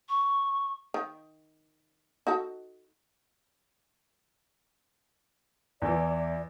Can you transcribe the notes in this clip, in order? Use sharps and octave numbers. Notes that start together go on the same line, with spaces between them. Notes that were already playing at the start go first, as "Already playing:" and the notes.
C#6
D#3
D#4 F#4 A4
E2 E3 D5